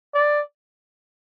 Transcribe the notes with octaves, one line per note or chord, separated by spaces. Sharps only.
D5